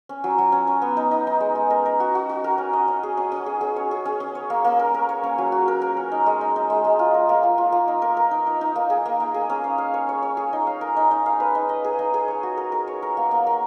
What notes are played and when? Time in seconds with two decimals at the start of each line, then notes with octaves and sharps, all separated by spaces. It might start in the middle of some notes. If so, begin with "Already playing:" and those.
0.09 C#4
0.24 F#3
0.38 F#3
0.52 C#4
0.67 C#4
0.82 B3
0.97 D#4
1.11 D#4
1.27 D#4
1.40 G#3
1.55 G#3
1.70 A#4
1.86 A#4
2.00 F#4
2.15 F#4
2.29 F#4
2.44 A#4
2.58 C#4
2.73 D#5
2.88 C#4
3.03 G#4
3.17 C#4
3.32 C#4
3.46 G#4
3.61 G#4
3.76 C#5
3.91 G#4
4.05 C#4
4.20 C#4
4.35 C#5
4.50 A#3
4.64 A#3
4.79 A#4
4.94 A#4
5.09 C#5
5.23 C#4
5.38 F#3
5.52 F#4
5.68 A#4
5.82 A#4
5.97 C#4
6.12 D#4
6.26 G#3
6.41 D#4
6.56 D#4
6.70 G#3
6.84 G#3
6.99 F4
7.14 A#4
7.29 A#3
7.43 F4
7.58 F4
7.72 A#3
7.88 D#4
8.02 A#4
8.17 A#4
8.31 D#4
8.47 D#4
8.61 D#4
8.76 A#3
8.90 G#4
9.06 A#3
9.20 A#3
9.34 G#4
9.50 C#4
9.64 F5
9.78 F5
9.94 C#5
10.09 C#5
10.23 C#5
10.37 G#4
10.53 D#4
10.67 F5
10.81 A#4
10.96 D#4
11.11 D#4
11.26 F5
11.40 B4
11.55 D#4
11.69 D#5
11.84 G#4
11.99 D#4
12.14 G#4
12.28 C#5
12.43 F#4
12.57 A#4
12.72 A#4
12.88 C#5
13.02 A#4
13.17 A#3
13.31 A#3
13.47 A#3